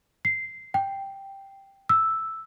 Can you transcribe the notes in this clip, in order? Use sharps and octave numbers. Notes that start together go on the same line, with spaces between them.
C7
G5
E6